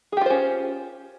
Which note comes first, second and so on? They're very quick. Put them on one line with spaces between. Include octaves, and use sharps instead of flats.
G#4 G4 F4 C5 C#4